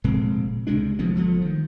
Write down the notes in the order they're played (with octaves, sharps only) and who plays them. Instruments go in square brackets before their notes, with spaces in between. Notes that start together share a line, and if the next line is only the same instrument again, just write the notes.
[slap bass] F1 A#2 G#3 C4
C#2 C3 G#3 D4
C2 F3 G#3 B3
G1 F3 A3
D#3